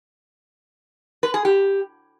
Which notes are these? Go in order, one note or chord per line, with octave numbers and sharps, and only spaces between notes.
B4
G#4
G4